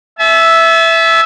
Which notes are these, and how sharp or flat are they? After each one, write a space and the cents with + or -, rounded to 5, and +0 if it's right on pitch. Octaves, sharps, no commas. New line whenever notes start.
E5 +0 A5 -45